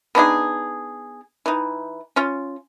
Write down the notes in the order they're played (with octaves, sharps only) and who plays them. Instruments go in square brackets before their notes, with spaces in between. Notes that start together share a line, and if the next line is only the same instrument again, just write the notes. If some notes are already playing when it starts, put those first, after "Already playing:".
[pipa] B3 D4 D#4 G#4
E3 D#4
C#4 F4